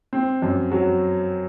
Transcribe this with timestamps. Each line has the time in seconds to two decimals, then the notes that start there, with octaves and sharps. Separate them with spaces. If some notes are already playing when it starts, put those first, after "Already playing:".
0.13 C4
0.42 F#2
0.71 F#3